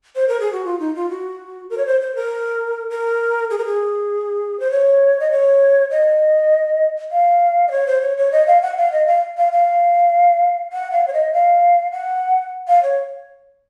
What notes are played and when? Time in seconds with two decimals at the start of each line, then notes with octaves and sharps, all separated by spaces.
0.16 C5
0.28 A#4
0.40 G#4
0.53 F#4
0.65 F4
0.80 D#4
0.95 F4
1.10 F#4
1.70 A#4
1.78 C#5
1.86 C5
2.01 C5
2.15 A#4
2.90 A#4
3.50 G#4
3.58 A#4
3.66 G#4
4.60 C5
4.71 C#5
5.20 D#5
5.31 C#5
5.91 D#5
7.12 F5
7.68 D#5
7.71 C#5
7.87 C5
8.02 C#5
8.17 C#5
8.32 D#5
8.47 F5
8.62 F#5
8.77 F5
8.92 D#5
9.07 F5
9.37 F5
9.52 F5
10.73 F#5
10.92 F5
11.08 C#5
11.13 D#5
11.33 F5
11.92 F#5
12.68 F5
12.83 C#5